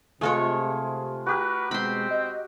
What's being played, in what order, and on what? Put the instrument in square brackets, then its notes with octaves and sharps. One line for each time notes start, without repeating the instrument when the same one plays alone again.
[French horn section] C3 [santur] G#3 F4 G#4 [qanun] A3 A4 C#5
[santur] F#4 G4 A#4 [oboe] B4
[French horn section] B2 G#3 [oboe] C4 [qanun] B5 C6
[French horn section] D#5